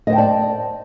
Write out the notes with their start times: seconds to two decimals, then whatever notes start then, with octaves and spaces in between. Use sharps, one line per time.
0.07 D#5
0.10 C5
0.13 G5
0.15 A5
0.18 D5